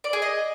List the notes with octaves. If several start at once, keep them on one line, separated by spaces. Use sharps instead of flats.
D5
G#4
D#5